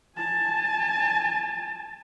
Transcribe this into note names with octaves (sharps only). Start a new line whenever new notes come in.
G#5 A5